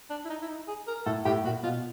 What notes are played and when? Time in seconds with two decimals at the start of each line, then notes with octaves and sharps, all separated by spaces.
0.10 D4
0.25 E4
0.29 D#4
0.41 E4
0.48 D#4
0.68 G#4
0.87 A#4
1.05 A2 A4
1.25 A2 G4
1.44 A#2 F#4
1.63 B2 F4